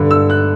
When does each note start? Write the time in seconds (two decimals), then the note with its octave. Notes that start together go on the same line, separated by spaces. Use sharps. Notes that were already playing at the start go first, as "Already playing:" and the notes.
Already playing: G2 D3
0.11 E6
0.30 F#6